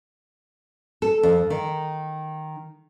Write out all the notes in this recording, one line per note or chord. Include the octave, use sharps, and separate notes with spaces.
A4
F2
D#3